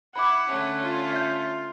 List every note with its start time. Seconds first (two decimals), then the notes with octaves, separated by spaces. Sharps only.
0.16 E4 F#5 B5 D6
0.48 D3 A3 C#4
0.82 F4
1.13 E5 G6